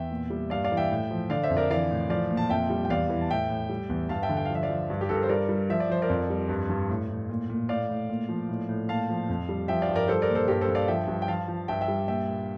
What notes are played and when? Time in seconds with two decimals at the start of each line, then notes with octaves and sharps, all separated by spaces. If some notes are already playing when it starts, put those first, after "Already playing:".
Already playing: E2 E5 G5
0.11 A#2
0.30 G3
0.50 G2 D5 F5
0.64 D5 F5
0.71 E3
0.77 E5 G5
0.91 A2
1.11 F3
1.30 D3 D5 F5
1.43 C5 E5
1.50 F2
1.57 A#4 D5
1.70 E3 D5 F5
1.91 A2
2.10 F3 D5 F5
2.31 A#2
2.37 A5
2.50 F2 E5 G5
2.70 G3
2.85 G5
2.89 E2 D5 F5
3.09 E3
3.21 A5
3.30 A2 E5 G5
3.49 A2
3.70 G3
3.89 E2
4.09 G2 F5 A5
4.23 E5 G5
4.29 D3
4.37 G5
4.45 F5
4.50 F3 E5
4.63 D5 F5
4.70 F3
4.90 G2
5.01 G4
5.09 G2 A4
5.16 A#4
5.23 C5
5.29 G3 A#4 D5
5.49 G3
5.70 F3 E5
5.80 D5
5.90 F3 C5
6.02 A#4 D5
6.10 F2
6.30 G3
6.49 G2
6.69 G2
6.89 A2
7.10 A2
7.29 A#2
7.50 A#2
7.69 A2 D5 F5
7.89 A2
8.09 A#2
8.29 F3
8.49 A2
8.69 A2
8.88 A#2 F5 A5
9.09 F3
9.29 F2
9.49 G3
9.68 F3 E5 G5
9.82 D5 F5
9.88 G2
9.95 A#4 D5
10.08 G3 A4 C5
10.22 A#4 D5
10.29 A#2
10.35 A4 C5
10.48 G2 G4 A#4
10.61 A4 C5
10.68 G2
10.75 D5 F5
10.88 F3 E5 G5
11.08 G2
11.22 G5
11.28 F3 F5 A5
11.48 F3
11.68 G2 E5 G5
11.81 E5 G5
11.88 G3
12.08 A#2 E5 G5
12.27 A#2